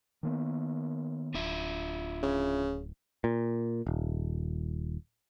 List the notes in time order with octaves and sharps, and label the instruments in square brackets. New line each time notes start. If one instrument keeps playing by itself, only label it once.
[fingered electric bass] D#3 A#3 B3
[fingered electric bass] D1 [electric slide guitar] D4 F4 E5
[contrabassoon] C#3
[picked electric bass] A#2
D#1